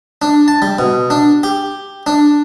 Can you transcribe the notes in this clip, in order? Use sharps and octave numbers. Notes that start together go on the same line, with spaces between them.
D4
A5
G3
B2
D4
G4
D4